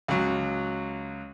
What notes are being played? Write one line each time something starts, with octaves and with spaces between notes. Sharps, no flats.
C#2 F#3